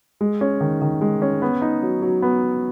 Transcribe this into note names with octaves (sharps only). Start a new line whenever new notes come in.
G#3
C#4
D#3
D#3
G#3
C#4
B3
D#4
F#3
F#3
B3